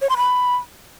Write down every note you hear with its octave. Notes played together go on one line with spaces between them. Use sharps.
C#5
C6
B5